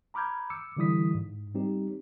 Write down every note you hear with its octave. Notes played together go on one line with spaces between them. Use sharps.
A#5 B5 D6 F6 G6 G#6
D6 E6 C#7
D3 E3 G3 E4 D#6 B6
G#2
G3 C4 D#4 G4